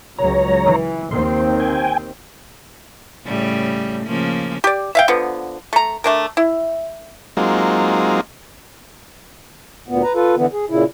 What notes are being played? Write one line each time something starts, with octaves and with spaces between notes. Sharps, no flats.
C#2 F#3 C#5 A#5
E3
D#2 D#3 C4 C6
G5 G#5
A2 C#3 G3
C#3 F3 A#3
G4 D5
E5 F5 G5
D3 F3 B3
A3 A#5
A3 D4 A#4
E4
F#3 G#3 A#3 C4 D#4 F4
D2 A#2 B3
B4 A#5
F4 A4 B4
D3 E3 B3
G#4
A#2 C#3 E4